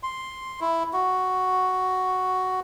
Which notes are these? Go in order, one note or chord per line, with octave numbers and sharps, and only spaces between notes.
C6
E4
F#4